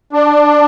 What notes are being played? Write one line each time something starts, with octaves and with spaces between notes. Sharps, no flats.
D4